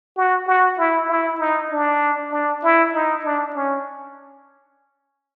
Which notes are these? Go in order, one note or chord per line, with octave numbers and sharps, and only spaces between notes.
F#4
F#4
E4
E4
D#4
D4
D4
E4
D#4
D4
C#4